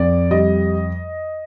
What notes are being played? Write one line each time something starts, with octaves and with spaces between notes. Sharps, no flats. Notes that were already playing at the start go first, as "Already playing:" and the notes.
Already playing: F2 D5
G3 D#5